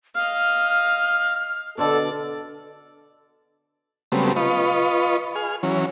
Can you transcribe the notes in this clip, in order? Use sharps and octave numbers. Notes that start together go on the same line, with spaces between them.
D#5 F5 F6
B2 D3 A4 D5
C#3 F#3 G3 A3 B3 C4
F4 B4 D#5 C#6
G#4 F6
E3 F#3 C#4